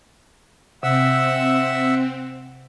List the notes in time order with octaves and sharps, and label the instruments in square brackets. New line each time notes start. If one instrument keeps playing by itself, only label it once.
[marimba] C3 [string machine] C4 [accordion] E5 F#5 E6